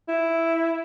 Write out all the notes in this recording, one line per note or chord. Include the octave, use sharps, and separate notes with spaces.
E4